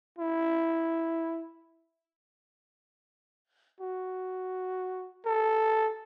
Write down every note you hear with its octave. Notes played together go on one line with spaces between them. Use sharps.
E4
F#4
A4